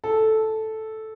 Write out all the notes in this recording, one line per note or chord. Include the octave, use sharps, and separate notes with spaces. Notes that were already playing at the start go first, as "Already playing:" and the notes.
A4